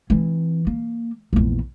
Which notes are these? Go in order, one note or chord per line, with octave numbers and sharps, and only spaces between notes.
E3 C4
A#3
A#1 E2